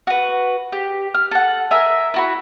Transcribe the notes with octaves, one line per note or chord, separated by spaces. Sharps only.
F#4 B4
G4
F6
A4 F#5
A#4 E5 G#5
E4 F#4 B5